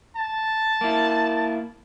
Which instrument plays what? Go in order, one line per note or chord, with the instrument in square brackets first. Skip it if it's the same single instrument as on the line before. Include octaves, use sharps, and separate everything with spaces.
[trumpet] A5
[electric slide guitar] A#3 E4